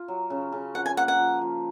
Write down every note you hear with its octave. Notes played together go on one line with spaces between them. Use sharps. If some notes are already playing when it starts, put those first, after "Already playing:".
Already playing: F4
F#3
C#3
C#3
F3 F#5
G#5
A#3 F#5
F#5
F3
F3